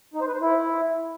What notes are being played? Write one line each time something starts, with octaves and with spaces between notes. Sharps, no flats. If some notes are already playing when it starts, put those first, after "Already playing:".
D#4
C5
B4
C5
E4